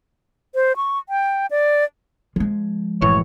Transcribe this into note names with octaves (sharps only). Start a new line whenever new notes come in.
C5
C#6
G5
D5
F3 G#3
F#1 A2 E3 C#5